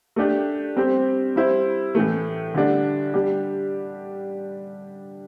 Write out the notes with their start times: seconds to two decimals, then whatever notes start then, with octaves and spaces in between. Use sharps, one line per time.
0.16 A3 D4 G4
0.77 G3 C4 G4 C5
1.36 G3 E4 C5
1.95 A2 E3 A3
2.54 D3 G3 D4
3.14 G3 D4 G4